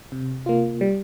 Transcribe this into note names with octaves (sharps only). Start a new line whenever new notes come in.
C3
A#3 F4
G3